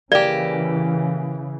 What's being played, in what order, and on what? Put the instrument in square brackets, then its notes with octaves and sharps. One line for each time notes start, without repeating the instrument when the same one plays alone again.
[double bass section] C#3 E3 [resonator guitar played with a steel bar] A#3 G4 [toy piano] D5